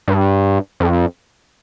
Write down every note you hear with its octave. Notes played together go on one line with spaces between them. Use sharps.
G2
F2